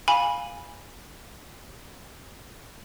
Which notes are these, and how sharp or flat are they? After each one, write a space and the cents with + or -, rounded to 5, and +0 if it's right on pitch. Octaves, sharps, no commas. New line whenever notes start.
F5 +10 G#5 -15 B5 -10